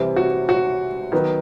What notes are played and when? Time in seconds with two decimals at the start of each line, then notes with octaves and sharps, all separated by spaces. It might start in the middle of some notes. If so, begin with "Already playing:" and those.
Already playing: C3 E3 G3 C4
0.16 F#4
0.49 F#4
1.12 D#3 F#3 B3